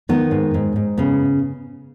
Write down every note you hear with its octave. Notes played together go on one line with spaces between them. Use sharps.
D#3 B3
G#2
G#2
G#2
C#3 B3